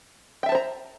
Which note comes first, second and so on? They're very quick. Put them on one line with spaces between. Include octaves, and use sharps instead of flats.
G5 E5 A5 C5 A#5